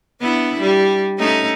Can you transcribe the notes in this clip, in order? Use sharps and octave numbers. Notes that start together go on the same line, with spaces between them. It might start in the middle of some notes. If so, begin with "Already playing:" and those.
B3 D4 E4
G3
A3 C#4 D#4